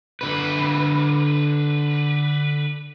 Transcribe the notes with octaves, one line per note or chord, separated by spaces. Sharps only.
D3 B4